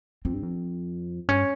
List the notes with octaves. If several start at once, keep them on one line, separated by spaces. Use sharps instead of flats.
F2 C4
G2
F2
G2 C#4